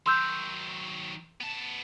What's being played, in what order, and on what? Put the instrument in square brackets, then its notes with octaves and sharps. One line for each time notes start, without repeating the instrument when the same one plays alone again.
[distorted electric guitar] D#3 F#3 [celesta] C6 E6 G6
[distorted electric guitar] B3 A5